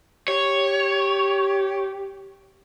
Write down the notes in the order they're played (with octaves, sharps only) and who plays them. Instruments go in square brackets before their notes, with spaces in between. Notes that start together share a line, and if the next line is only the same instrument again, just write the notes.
[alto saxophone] G4 [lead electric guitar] C#5